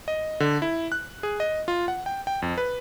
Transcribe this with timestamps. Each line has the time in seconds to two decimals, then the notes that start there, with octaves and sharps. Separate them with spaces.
0.08 D#5
0.40 D3
0.62 E4
0.92 F#6
1.23 G#4
1.40 D#5
1.68 F4
1.88 F#5
2.06 G5
2.27 G5
2.42 F2
2.58 B4